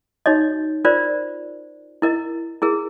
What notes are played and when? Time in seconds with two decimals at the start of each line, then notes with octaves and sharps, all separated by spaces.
0.26 D#4 F#4 C#5 D#5
0.85 F4 A#4 C5 D5
2.02 E4 A#4 D#5
2.62 E4 G#4 A#4